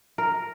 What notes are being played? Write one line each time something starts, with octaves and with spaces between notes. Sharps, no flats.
A#4